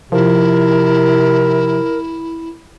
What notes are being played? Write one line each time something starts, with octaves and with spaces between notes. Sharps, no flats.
C3 F3 E4 A#4